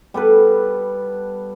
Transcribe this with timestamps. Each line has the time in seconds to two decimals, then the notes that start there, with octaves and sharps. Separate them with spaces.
0.14 G3 B3 A4 B4